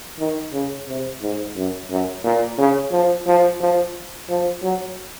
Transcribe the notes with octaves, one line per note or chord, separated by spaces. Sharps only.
D#3
C#3
C3
G#2
F#2
F#2
A#2
C#3
F3
F3
F3
F3
F#3